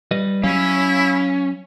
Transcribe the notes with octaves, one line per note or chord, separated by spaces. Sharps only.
G3 B4 D#5
F#3 C#4 E4 F5